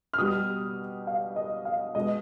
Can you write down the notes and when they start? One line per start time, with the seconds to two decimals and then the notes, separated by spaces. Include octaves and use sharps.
0.13 F6
0.18 B2 G3 D#6
1.07 F5
1.36 D#5
1.65 F5
1.95 B2 G#3 D#5